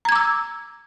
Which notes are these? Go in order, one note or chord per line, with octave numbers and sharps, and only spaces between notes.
A#5 D6 E6 G#6